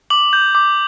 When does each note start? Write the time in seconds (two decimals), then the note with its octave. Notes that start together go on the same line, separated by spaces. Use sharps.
0.10 D6 F#7
0.33 G6
0.55 D6